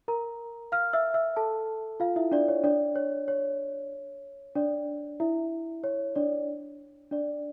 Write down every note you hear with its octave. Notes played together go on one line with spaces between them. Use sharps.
A#4 A#5
F5 F6
E5 E6
E5 E6
A4 A5
F4 F5
E4 E5
D4 D5
C#5
D4 D5
C#5
C#5
D4 D5
E4 E5
C#5
D4 D5
D4 D5